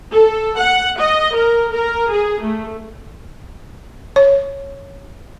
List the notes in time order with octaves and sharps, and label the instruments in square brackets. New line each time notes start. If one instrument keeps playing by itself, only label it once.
[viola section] A4
F#5
D#5
A#4
A#4
G#4
A3
[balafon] C#5